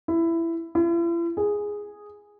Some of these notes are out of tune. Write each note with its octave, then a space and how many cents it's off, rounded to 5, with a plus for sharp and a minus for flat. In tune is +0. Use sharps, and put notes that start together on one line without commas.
E4 +15
E4 +45
G#4 -5